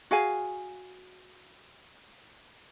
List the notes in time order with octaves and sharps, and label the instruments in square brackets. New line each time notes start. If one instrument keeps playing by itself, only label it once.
[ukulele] F#4 G#4 F5 G#5